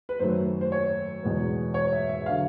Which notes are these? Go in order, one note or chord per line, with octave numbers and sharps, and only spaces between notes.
B4
F#2 D#3 F#3 A3 C5
C5
C#5
E2 B2 G#3 B3
C#5
E5
E5
D3 F#3 F5